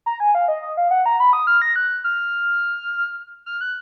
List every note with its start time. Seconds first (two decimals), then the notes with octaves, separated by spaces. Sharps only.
0.06 A#5
0.20 G#5
0.35 F5
0.48 D#5
0.62 D#5
0.77 F5
0.91 F#5
1.06 A#5
1.20 B5
1.33 D#6
1.47 F6
1.62 A#6
1.76 F#6
2.04 F6
3.46 F6
3.61 F#6